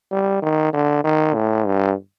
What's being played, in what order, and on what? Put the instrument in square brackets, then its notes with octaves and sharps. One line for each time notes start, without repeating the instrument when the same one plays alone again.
[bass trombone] G3
D#3
D3
D#3
A2
G2